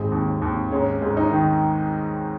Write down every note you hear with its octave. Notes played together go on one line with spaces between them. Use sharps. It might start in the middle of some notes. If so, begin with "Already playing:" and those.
Already playing: G#1 G#3 C4
D#2
D#2
G#2 C#4
G#2
D#4
D#3